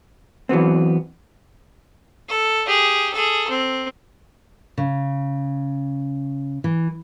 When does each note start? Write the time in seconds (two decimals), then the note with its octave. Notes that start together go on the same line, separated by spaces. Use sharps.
0.49 E3 F#3 B3 C4
2.29 A4
2.67 G4 G#4
3.13 G#4 A4
3.50 C4
4.78 C#3
6.64 E3